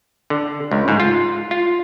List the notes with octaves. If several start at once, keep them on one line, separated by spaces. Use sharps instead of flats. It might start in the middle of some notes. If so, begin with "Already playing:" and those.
D3
C#2
G#2
F4
F4